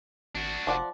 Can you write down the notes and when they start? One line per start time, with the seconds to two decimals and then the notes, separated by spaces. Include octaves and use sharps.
0.35 G#1 D4 F#4
0.67 F1 F3 D5 F#5